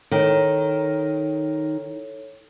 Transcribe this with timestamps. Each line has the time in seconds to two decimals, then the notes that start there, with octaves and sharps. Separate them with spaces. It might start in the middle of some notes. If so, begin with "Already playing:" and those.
0.12 D#3 A4 C#5